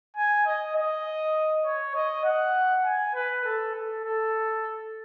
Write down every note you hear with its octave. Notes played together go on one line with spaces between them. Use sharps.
G#5
D#5
D#5
C#5
D#5
F#5
G#5
B4
A4
A4
A4